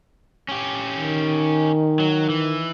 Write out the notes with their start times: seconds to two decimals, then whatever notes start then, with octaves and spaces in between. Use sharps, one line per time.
0.49 C#4 G4
0.96 D#3
2.00 F#3
2.29 E3